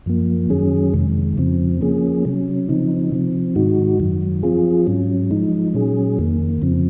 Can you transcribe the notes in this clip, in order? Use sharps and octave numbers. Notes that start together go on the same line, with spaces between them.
F#2 F3 A#3
F#2 D#3 F#3 C#4 G#4
F2 C3 D#3 G#3
F2 C#3 F3 C4
F3 A#3 C#4 G#4
C3 F#3 C#4
C#3 F3 C4 D#4
C3 F3 C4
G#2 D#3 G#3 D#4 F#4
F#2 D#3 F#3
F3 C4 F4 G#4
G#2 F#3 C#4
F3 G#3 D#4
A#2 F#3 C#4 G#4
F2 D#3 A#3
F2 C#3 F3 C4